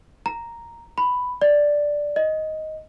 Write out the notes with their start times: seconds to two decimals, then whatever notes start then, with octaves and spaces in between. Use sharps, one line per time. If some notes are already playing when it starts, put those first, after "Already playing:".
0.26 A#5
0.98 B5
1.42 D5
2.16 D#5